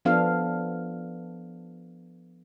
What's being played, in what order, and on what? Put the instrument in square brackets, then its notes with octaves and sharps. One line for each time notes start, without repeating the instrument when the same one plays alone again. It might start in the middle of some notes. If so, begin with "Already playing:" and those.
[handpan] F3 B3 D4 A4 F5